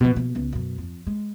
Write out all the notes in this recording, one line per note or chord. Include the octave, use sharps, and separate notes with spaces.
B2 F3
B2
C#2 B3
F#2 B2
F2
G#3